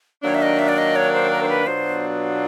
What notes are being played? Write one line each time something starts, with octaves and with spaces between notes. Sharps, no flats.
D#3 F#3 A#3 D4 C#5
E5
D#5
E5
D5
D#5
C#5
C5
A#4
C5
B4
B2 F#3 B3 D4 F4 C5